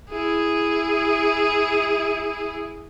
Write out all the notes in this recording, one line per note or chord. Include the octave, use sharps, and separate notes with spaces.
E4 G#4